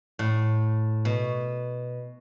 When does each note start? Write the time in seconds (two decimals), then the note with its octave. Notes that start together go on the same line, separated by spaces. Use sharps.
0.19 A2
1.05 B2